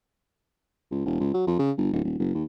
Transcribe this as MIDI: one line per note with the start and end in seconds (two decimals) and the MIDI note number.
0.91 1.04 37
1.05 1.15 28
1.20 1.29 37
1.34 1.43 54
1.47 1.58 41
1.59 1.71 49
1.77 1.89 31
1.93 2.03 26
2.04 2.17 27
2.19 2.30 30
2.34 2.44 39